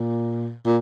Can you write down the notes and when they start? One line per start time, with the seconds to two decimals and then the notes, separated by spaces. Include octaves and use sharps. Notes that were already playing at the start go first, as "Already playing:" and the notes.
Already playing: A#2
0.65 A#2